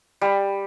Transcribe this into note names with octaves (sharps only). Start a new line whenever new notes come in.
G3